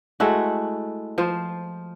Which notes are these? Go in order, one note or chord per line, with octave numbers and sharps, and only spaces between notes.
G#3 A3 E4 F#4
F3 C5